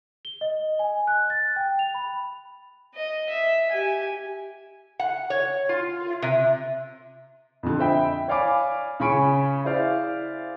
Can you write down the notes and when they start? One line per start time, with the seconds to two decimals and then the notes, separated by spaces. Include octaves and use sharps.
0.25 G7
0.41 D#5
0.79 G#5
1.07 F#6
1.30 A6
1.56 G5
1.79 F7
1.94 B5
2.95 D#5
3.29 E5
3.71 G4 G#5
4.99 F#5
5.30 C#5
5.69 F4
6.22 C3
7.63 F2 D3
7.79 C5 D#5 E5 G5 B5
8.28 C#5 D5 F5 G#5 B5 D6
9.00 C#3 C#4 G#5 B5 C#6 D7
9.65 E4 G#4 C5 D5 F5